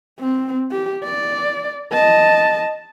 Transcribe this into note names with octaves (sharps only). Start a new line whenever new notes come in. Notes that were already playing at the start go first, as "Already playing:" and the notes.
C4
G4
D5
D#5 A5